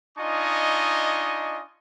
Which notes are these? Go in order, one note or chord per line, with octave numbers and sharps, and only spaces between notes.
D4 D#4 F4 D#5 G#5 C#6